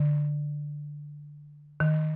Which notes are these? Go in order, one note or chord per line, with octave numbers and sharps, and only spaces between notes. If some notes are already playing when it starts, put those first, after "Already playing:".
Already playing: D3
D#3